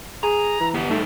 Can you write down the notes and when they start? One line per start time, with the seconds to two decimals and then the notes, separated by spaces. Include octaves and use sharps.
0.23 G#4 A#5
0.60 E3
0.74 B3 G4
0.90 G3 A3 D#4